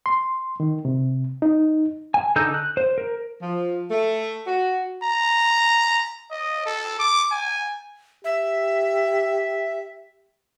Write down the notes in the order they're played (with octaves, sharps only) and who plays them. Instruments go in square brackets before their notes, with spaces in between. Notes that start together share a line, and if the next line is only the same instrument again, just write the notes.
[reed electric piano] C6
D#3
C3
D#4
[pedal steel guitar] G#5
D3 D#4 A4 E6 G6
F#6
C5
A#4
[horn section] F3
A3
F#4
[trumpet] A#5
D#5
A4
D6
G#5
[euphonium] G4 [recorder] E5